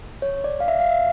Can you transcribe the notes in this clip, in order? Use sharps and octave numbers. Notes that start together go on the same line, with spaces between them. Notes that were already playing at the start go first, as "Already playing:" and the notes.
C#5
D5
F5
E5
F5
E5